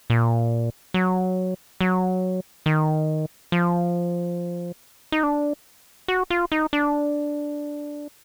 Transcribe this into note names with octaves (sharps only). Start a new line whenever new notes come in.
A#2
F#3
F#3
D#3
F3
D#4
D4
F#4
F4
D#4
D4